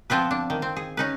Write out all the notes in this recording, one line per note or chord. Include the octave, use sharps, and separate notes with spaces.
F3 B3 C4 F4 B4
D4
D#3
C4
G#4
C#4 D#4 B4